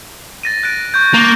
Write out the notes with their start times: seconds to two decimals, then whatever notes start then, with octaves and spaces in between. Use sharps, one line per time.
0.43 A6 A#6 D#7
0.63 F#6 A#6 D7
0.94 C#6 G6
1.14 A#3